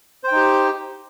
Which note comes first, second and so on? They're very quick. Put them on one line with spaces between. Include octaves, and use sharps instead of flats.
C5 G5 D#4 G4